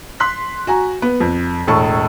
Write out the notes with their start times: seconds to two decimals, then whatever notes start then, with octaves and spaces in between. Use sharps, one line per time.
0.20 C6 F#6 B6
0.67 F#4 G#5 A#5
1.02 B3
1.20 F2
1.67 E1 A2 A5 C#6